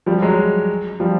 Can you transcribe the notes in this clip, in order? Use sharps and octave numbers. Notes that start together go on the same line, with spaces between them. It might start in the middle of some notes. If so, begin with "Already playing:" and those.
F3 G3
F#3 G#3
F3 G3